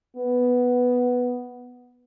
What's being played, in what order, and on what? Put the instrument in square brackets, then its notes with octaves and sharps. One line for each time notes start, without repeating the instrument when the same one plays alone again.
[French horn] B3